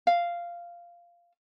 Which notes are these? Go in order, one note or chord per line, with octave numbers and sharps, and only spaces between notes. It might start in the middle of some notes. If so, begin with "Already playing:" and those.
F5